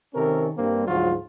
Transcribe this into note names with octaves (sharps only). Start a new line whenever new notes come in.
C3 D#3 C4 C#4 A4 A#4
G2 A#3 C4
D2 G#2 F3 F#3 F4 F#4